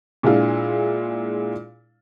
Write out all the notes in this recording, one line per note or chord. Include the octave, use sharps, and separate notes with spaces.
A#2 G#3 D4 E4 F4